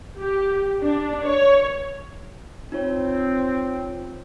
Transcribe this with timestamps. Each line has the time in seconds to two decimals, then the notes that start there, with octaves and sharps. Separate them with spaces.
0.17 G4
0.82 D4
1.26 C#5
2.72 C4 D#4 F4 C#5